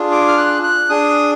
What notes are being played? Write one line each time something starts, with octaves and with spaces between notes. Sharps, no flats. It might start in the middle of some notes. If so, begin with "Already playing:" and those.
Already playing: D4 F4 G#4
D6
F6
F#6
F#6
D4 G#4 D#6